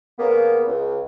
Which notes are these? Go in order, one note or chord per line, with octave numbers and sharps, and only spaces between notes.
C#3 A#3 B3
C#2